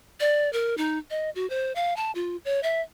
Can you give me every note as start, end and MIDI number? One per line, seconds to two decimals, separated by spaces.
0.20 0.51 74
0.53 0.75 70
0.78 0.98 63
1.10 1.30 75
1.35 1.48 66
1.50 1.72 72
1.75 1.96 77
1.96 2.11 81
2.15 2.37 65
2.45 2.62 73
2.63 2.81 76